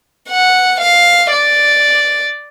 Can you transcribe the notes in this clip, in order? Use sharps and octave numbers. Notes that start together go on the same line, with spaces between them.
F#5
F5
D5